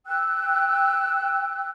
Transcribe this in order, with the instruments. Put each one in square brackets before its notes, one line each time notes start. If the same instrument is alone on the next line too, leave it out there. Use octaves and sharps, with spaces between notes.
[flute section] G5 E6 F#6